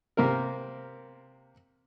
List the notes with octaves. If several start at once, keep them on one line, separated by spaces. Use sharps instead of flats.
C3 A#3 C4 A#4